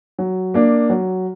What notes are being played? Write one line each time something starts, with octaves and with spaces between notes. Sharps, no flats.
F#3
A#3 D4
F#3